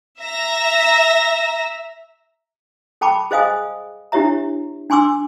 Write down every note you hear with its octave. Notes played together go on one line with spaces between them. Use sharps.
E5 A#5 E6 A#6
A4 G5 A5 B5 D6
G#4 C5 D#5 F5 G#5 D#6
D4 E4 G4 C#5 E5 A#5
D4 G#5 C6 D6 E6